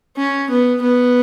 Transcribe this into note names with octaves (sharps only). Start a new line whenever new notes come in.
C#4
B3
B3